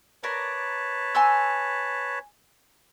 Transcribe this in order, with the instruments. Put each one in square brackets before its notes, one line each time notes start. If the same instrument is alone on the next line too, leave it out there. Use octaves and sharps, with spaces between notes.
[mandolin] A#4 D5 [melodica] B4 C#5 A5
[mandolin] G#5 C6 E6